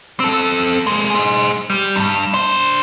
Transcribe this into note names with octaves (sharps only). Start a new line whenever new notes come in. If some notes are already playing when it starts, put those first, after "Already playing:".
C4 A4
G#3 A#3
G#4 C5
G3
E2 G2
D4 C5